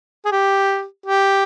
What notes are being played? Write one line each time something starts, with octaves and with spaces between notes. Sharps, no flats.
G#4
G4
G4